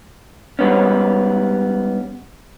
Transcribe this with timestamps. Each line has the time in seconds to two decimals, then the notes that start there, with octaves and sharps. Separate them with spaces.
0.59 G#2 G3 B3 C#4